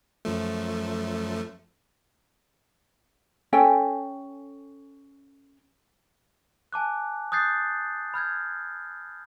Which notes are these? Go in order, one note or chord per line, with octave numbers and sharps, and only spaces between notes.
F#2 F3 A3
C#4 A4 G5 G#5
G#5 A5 D6 F#6
D#6 F#6 G6 A6 C7
B5 F6 G6 G#6